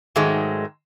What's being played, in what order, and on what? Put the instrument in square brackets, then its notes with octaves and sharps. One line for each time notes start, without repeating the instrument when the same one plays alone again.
[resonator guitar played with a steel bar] G#2 D#3 F#3 G#3 A3